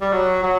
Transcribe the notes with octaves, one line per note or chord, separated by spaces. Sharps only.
G3
F#3
F#3